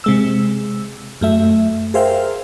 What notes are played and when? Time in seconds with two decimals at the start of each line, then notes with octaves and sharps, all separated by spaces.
0.04 C3 G#3 E6
1.21 F#2 A3 E5
1.94 G#4 A#4 C5 E5 F5 G5